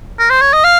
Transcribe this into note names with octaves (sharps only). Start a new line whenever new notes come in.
A#4
C5
C#5
D#5
F5